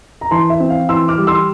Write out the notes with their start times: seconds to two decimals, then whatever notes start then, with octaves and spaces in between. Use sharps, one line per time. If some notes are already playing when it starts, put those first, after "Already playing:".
0.21 A#5
0.31 E3 A5 C6
0.50 E5
0.60 C4
0.70 F5
0.89 E3 C6 E6
1.08 D6 F6
1.18 G3
1.27 C6 E6